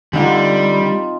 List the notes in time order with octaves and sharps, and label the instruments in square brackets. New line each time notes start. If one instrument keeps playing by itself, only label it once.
[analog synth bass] D3 [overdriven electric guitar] G3 [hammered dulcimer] C4 D#4 F4